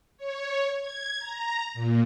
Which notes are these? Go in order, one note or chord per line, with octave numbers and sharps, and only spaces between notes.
C#5
G#6
A#5
A#2